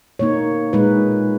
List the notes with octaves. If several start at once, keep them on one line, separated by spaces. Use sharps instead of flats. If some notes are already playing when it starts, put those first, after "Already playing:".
B2 A#3 D#4 C#5
A#2 G#3 D#4 B4